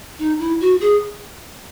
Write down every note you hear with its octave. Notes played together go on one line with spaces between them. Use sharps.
D#4
E4
F#4
G#4